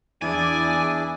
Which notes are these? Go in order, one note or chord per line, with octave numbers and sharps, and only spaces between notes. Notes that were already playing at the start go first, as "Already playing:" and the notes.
E2 D4 E4 G#4 D5 G#5